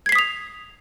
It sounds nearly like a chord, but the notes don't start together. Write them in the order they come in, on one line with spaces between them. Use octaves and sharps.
G#6 C7 B6 D#6 F7